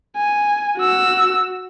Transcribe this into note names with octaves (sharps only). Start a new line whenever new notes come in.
G#5
F#4 E6